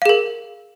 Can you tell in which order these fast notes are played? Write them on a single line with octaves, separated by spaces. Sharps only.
F5 G#4 A#4